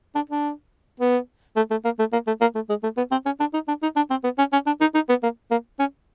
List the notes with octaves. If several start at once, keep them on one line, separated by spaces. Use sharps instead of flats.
D4
D4
B3
A3
A3
A#3
A3
A#3
A3
A#3
A3
G#3
A3
B3
C4
C#4
D4
D#4
D4
D#4
D4
C4
B3
C#4
C#4
D4
D#4
D#4
B3
A#3
A#3
C#4